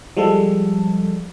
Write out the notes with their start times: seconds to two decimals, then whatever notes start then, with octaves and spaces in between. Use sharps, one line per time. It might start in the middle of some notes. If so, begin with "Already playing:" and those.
0.17 F3 G3 G#3 A4